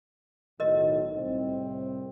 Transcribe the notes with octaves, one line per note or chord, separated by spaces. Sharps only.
B1 A2 D#3 A#4 D#5
C2 A2 C4